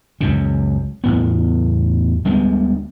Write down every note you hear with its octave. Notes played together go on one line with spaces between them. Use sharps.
C#2 F#2 C#3
E2 A2 B3
D2 G3 G#3 B3